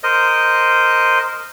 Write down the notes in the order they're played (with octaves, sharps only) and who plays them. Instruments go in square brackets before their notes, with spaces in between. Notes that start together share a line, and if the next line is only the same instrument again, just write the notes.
[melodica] A#4 C5 D#5